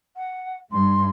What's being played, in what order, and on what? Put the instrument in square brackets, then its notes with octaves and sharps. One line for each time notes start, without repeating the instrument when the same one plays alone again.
[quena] F#5
[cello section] G2 [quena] C6